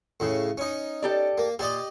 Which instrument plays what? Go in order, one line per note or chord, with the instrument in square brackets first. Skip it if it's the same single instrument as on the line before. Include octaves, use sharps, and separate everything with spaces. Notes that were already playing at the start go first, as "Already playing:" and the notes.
[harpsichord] A2 C#3
C#4 D#4
[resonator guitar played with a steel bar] G4 A4 D5
[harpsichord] A#3
[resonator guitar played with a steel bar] A#2 [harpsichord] G4 D5 D#5